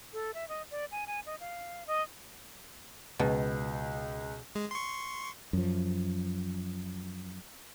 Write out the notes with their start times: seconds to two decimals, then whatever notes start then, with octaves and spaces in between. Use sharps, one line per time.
0.13 A4
0.34 E5
0.49 D#5
0.71 D5
0.92 G#5
1.07 G#5
1.26 D#5
1.40 F5
1.87 D#5
3.19 C#2 B2
4.55 G#3
4.71 C6 C#6
5.53 F#2 F3